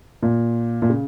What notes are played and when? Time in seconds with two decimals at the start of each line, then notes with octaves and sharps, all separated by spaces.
0.22 A#2
0.82 A#2
0.90 C#3